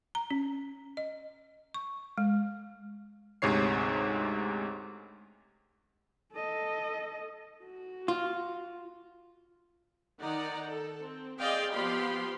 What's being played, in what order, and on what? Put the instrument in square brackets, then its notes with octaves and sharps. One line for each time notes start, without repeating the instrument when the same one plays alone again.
[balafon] A#5
C#4
D#5
C#6
G#3
[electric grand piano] D2 G#2 C3 C#5 C7
[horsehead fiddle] A4 D#5
F#4
[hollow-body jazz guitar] F4
[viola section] D#3 D#4 D5 F#5 A#5
A4
C4
C4 G#4 D5 D#5 F5 G5
F3 B3 G4 F5 B5 C6